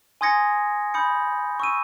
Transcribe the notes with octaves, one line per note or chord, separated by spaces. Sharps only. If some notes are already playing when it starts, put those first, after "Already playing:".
G#5 C6 D#6 G#6 A#6 C#7
B5 D#6 G6 C#7
C#6 E6 D#7